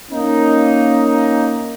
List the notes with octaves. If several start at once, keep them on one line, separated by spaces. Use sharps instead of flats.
A#3 C#4 D#4